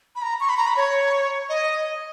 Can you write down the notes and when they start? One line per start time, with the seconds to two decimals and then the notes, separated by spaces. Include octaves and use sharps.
0.16 B5
0.22 A#5
0.40 C#6
0.49 B5
0.57 A#5
0.67 B5
0.77 C#5
1.49 D#5